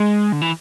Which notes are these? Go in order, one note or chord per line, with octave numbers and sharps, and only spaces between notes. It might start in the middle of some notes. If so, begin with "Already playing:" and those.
Already playing: G#3
D3
E3